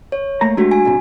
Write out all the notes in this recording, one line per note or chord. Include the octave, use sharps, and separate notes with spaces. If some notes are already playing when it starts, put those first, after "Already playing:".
C#5
A3 A#3 A#5
G#3 A3 D4 F#4 G4
G#5
B1 G#2 C3